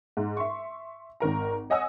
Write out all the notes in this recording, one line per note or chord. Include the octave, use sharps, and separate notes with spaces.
G#2
E5 C6 C#6
G#1 D#3 A#4 A#5
C#5 D#5 F#5 G#5 D#6 E6